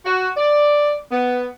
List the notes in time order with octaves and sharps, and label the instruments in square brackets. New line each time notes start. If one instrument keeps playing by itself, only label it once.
[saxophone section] F#4
D5
B3